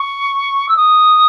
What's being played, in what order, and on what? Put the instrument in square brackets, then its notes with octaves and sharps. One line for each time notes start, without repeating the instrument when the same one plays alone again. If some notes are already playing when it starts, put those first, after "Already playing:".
Already playing: [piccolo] C#6
E6
D#6